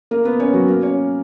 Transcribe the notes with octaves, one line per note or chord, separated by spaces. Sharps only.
A#3 A#4
B3 B4
C#4 C#5
F#3 F#4
A#3 A#4
C#4 C#5